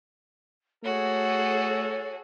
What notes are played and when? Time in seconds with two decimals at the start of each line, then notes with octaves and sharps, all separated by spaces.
0.84 A3 F#4 G#4 A4 C#5